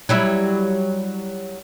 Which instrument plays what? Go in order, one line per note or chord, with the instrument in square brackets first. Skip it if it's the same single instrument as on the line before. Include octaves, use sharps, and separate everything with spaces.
[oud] F#3 G3 E4